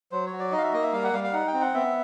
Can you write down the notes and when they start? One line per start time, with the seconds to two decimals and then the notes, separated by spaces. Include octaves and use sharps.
0.11 F#3 C5
0.26 C#5
0.33 F#4
0.39 D5
0.52 D#4 D#5
0.58 F5
0.63 E5
0.73 A#3 D#5
0.82 E5
0.93 G3 F5
1.04 F#5
1.13 G3 F5
1.24 F5
1.33 D#4 F#5
1.47 G5
1.53 C4
1.61 F#5
1.74 B3 E5